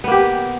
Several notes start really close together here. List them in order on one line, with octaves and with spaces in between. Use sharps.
B3 A#3 G4